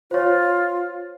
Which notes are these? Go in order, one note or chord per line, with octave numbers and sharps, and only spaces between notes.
F4 C5 C#5